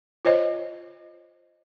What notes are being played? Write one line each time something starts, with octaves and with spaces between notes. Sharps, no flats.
F4 C5 C#5 D#5